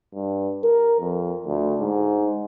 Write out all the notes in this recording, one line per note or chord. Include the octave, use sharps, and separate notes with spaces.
G2
A#4
F2
D2
G#2